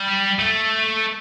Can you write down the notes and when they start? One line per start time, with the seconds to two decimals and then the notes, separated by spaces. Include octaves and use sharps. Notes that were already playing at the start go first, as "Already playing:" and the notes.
Already playing: G3
0.39 A3